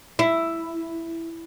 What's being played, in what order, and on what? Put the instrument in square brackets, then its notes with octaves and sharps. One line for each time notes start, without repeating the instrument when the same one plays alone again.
[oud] E4